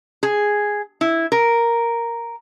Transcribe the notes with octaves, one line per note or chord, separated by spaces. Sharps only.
G#4
E4
A#4